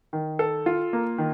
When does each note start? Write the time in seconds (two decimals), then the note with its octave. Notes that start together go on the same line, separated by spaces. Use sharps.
0.13 D#3
0.39 A4
0.66 F4
0.93 A#3
1.18 D#3